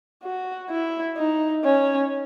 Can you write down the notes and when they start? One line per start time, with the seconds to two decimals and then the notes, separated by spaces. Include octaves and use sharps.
0.23 F#4
0.70 E4
1.17 D#4
1.64 C#4